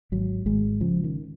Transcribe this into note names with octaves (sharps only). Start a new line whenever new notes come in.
G#1 F#3
G#1 G#3
C#3 F3
D#3